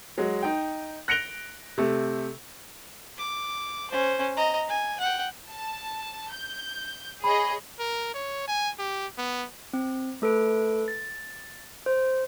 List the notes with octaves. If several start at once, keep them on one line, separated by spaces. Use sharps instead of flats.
F#3 G#3
D#4 G5
F#6 A#6 C#7 D7 F7 G7
C3 A3
D6
C#4 C5
D#5 A#5
G#5
F#5 G5
A5
G6
G#4 C#5 D#5 B5
A#4
C#5
G#5
G4
B3
C4
A3 A4 B4 D7
A6
C5